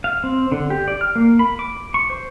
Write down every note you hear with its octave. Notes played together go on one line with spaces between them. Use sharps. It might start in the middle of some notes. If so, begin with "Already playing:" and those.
F5
C4
D3
G4
D5
F6
A#3
B5
D6
C#6
C5